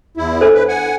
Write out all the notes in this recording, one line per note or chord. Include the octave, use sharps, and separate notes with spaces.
E2 E4
D4 A4 C5
B4
F#5 G#5